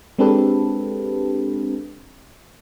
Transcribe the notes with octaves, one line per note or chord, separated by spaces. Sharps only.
G#3 C4 D4 G4 A4 B4